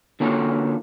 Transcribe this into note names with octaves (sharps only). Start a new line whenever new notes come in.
D3 A#3 C#4 F4 F#4 A4